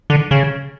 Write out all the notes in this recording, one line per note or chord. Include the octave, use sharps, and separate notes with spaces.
D3
C#3